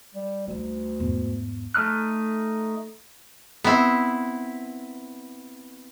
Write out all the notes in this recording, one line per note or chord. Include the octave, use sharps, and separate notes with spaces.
G3
D2 G3 D#4
E2 G#2
A3 D#4 F6 F#6
B3 C4 E4